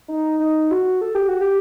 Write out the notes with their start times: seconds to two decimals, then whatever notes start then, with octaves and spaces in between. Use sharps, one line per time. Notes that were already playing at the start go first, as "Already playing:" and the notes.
0.08 D#4
0.40 D#4
0.71 F#4
1.01 A4
1.15 G4
1.28 F#4
1.41 G4